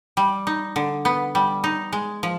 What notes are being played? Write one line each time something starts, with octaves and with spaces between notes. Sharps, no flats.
G3
D#4
D3
B3
G3
D#4
G#3
F3